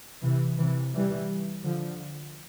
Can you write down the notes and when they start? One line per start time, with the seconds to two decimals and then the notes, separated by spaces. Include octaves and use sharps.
0.23 C3 E3
0.58 C3 E3
0.94 E3 G3
1.64 D3 F3